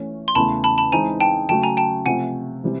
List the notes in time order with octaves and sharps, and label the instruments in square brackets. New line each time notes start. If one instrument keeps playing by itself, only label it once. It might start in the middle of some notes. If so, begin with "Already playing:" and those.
Already playing: [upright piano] E3 A3 C#4
[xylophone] C6
[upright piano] E2 C#3 E3 A3 [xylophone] A5 B5
[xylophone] A5 B5
A5 B5
[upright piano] E3 G#3 C4 D#4 [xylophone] G#5 A#5
[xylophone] G5 A5
[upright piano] C#3 F#3 A3 [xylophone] G5 A5
[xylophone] G#5 A#5
G5 A5
[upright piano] C3 F3 A3 [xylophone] F#5 G#5
[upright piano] C3 E3 G3